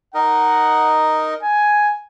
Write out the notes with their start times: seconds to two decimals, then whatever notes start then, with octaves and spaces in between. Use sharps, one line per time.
0.14 D#4 A#4 D#5 F#5
1.43 G#5